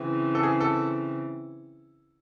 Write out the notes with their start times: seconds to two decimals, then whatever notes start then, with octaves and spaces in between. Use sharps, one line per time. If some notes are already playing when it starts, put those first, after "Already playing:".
Already playing: C#3 E3 C4
0.35 A4
0.43 G#4
0.60 A4